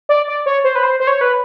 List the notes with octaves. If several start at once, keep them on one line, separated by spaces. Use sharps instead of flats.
D5
D5
C#5
C5
B4
C5
C5
C#5
B4